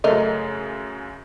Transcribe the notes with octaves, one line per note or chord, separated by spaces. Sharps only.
F#2 C#3 A3 A#4 D#5